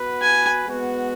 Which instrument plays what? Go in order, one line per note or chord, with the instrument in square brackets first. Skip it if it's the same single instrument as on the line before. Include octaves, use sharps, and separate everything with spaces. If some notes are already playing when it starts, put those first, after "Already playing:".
Already playing: [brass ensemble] B3 F#4 B4
[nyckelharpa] G#5
[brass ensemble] G#3 B3 F#4 B4